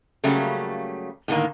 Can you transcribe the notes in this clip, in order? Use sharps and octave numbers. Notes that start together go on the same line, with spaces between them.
C#3 F#3 G3 A3 A#3
A2 D3 D#3 A#3